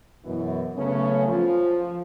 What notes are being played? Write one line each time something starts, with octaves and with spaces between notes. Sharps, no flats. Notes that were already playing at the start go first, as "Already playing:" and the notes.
F#2 B2 E3
C#3 F#3 A3 B3 C#4
F3